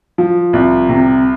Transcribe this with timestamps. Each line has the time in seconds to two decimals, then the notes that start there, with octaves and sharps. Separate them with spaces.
0.18 F3
0.53 C2
0.89 C3